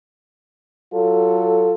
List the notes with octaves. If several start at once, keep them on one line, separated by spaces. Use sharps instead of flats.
F#3 F4 A4